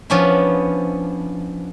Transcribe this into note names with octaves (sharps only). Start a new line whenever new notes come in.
F3 B3 C#4 D4 E4